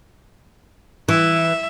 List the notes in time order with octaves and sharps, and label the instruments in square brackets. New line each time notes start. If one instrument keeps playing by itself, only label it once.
[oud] E3 [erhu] E5